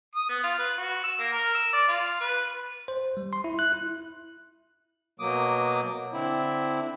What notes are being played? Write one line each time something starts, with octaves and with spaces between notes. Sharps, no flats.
D#6
B3
F4
B4
F#4
E6
A#3
A#4
E6
D5
F4
B4
C5
G3
C6
E4
F#6
E4
B2 F#3 A#3 D6 D#6
D3 C4 E4